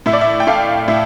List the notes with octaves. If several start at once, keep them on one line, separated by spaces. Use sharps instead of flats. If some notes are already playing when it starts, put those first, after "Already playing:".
A2 E5
D5
E5
G5
A3 F5
A2 E5